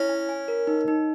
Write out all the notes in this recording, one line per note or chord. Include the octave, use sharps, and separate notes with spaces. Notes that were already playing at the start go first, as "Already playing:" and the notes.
Already playing: C#4 E4
G#5
G#5
A#4
D#4
D#4